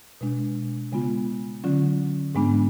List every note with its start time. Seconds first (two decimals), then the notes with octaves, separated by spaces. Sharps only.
0.21 B2 G#3 D4
0.92 C#3 G#3 B3 F4
1.64 D3 F#3 C#4 F4
2.35 G#2 G#3 B3 D4